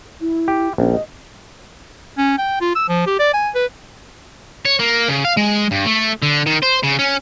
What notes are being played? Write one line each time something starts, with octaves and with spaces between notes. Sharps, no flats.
E4
G4
A#1 C#4
D#5
C#4
G5
F4
E6
F3
G4
D5
G#5
B4
C#5
A#3
C#3
F5
G#3
G2
A3
D3
D#3
C5
C#3
C#4